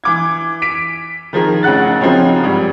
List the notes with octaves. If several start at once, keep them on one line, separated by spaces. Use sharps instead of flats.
E3 D6 G#6
B6 D7
D#3 F3 G#4 A#4
A1 C#3 F#5 F#6 A6
C#3 F3 F#3 C4 C#4 D#4
G#1 G3